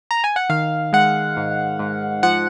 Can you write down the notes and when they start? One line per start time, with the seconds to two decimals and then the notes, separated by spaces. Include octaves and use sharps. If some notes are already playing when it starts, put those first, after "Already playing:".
0.11 A#5
0.24 G#5
0.36 F#5
0.50 D#3 F5
0.93 G#3 F#5
1.37 G#2
1.79 G#2
2.23 F3 F#5